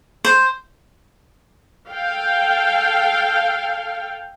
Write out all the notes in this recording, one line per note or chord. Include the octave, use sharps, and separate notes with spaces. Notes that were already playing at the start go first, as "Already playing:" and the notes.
C5
A4 F5 G5